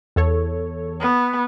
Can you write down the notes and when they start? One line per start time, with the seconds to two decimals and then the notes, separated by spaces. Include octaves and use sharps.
0.16 E2 A4 C#5
1.01 B3